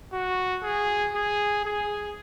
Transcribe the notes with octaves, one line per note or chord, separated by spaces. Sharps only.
F#4
G#4
G#4
G#4